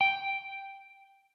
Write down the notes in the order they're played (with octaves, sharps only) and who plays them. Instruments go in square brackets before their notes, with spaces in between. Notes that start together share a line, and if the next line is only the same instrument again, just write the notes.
[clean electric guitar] G5